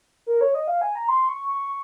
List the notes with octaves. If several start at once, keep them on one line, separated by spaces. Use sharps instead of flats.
A#4
C#5
D#5
F5
G#5
A#5
C6
C#6